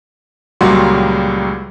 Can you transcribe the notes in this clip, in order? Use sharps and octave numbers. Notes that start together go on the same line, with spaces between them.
C#2 A#2 F#3 G3 F#4 C6